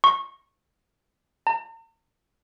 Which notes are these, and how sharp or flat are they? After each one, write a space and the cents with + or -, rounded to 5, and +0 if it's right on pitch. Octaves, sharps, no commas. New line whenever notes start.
C#6 -20
A#5 -45